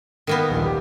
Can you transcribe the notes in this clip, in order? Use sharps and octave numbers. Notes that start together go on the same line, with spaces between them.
D#3 A#3 B3
D#1 A#1
G4